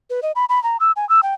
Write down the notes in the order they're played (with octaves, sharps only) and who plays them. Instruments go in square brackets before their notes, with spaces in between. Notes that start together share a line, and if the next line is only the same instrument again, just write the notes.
[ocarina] B4
D#5
B5
B5
A#5
E6
G#5
E6
G5